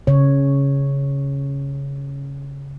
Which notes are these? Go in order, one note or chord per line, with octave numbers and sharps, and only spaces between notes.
C#3 C#5